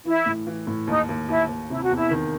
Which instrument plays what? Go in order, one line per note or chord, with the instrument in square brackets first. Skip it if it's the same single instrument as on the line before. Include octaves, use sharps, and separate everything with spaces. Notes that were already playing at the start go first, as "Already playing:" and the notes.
[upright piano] E3 [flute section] E4
[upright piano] A2
E3
A2
[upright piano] D#2 [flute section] D#4
[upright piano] D#2
[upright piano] D#2 [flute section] E4
[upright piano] D#2
[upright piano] C3 [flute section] E4
[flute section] F#4
[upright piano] E2 [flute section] E4
[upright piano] D#3